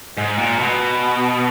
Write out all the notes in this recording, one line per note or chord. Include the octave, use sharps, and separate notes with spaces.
G#2
A#2
B2